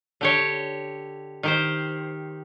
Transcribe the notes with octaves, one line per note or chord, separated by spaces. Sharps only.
D3 G4 C#5
D#3 G4 C5